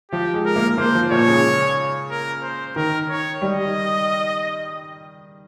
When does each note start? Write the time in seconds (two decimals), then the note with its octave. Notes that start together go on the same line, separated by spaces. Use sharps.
0.11 F3 G4
0.34 G#3
0.46 A#4
0.56 A#3
0.78 A#3 C5
0.95 F3
1.11 A#2 C#5
1.28 C#3
2.11 A#4
2.42 C5
2.76 D#3 A#4
3.09 C#5
3.42 G3 D#5